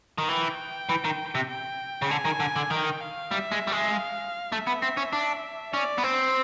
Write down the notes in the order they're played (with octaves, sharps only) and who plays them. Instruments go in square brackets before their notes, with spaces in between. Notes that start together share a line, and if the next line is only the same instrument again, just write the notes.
[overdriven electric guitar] D#3
[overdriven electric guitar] E3 [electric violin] G5
[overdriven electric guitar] E3
D#3
C3
[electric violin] G5
[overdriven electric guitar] C#3
[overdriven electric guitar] D3 [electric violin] G#5
[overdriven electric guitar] D#3
D3
D3
[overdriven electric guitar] D#3 [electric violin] G5
[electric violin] F5
[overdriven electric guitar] G3 [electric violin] E5
[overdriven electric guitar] G#3
G3
G#3
[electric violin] F5
[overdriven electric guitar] A3 [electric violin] E5
[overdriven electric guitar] B3
C4
C#4
D4
[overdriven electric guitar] C#4 [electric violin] D5
[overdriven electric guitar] B3
[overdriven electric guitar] C4 [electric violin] C5